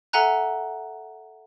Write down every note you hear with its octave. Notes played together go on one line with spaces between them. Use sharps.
A4 E5 F#5 G#5 A#5 F#6